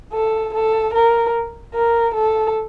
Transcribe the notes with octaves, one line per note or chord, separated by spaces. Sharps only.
A4
A4
A#4
A#4
A4